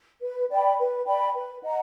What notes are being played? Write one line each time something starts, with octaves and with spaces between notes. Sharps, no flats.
B4
D5 G5 B5
B4
D5 G5 B5
B4
D#5 F#5 A#5